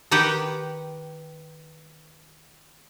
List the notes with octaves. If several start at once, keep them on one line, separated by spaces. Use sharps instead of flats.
D#3 G4 B4 F#5 G5